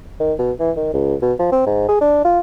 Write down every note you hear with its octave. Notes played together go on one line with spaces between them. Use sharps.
D#3
B2
E3
D#3
C#2
B2
F3
C4
G#2
G#4
D4
F4